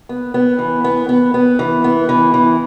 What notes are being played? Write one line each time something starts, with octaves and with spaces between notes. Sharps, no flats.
B3
B3
E3
B3
B3
B3
E3
B3
E3
E3